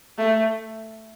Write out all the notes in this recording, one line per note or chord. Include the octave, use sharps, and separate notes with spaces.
A3